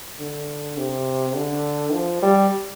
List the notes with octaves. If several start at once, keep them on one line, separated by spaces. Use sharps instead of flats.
D3
C3
D3
F3
G3